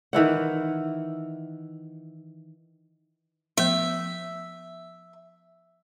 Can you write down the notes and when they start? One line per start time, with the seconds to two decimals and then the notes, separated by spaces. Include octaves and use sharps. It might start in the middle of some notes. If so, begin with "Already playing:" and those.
0.13 D#3 E3 E4 F#5
3.57 F3 A3 B3 E5